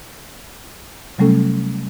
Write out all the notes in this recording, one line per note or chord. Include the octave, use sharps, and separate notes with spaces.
C3 F#3 G3 A3 C#4 A4